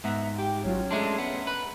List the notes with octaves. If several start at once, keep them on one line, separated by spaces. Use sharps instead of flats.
G#2 B3 E5 F#5 A#5
G4 G5
A1 F#3 C#4 F4
G#3 A3 D4 E5 A#5 C6
B3
B4